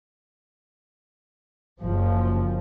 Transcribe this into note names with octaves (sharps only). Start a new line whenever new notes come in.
F#1 F3